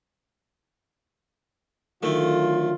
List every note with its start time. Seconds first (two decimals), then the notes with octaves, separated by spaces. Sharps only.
2.03 D3 D#3 F#3 A3 F4